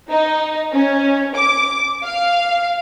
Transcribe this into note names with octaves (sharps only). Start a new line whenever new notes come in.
D#4
C#4
D6
F5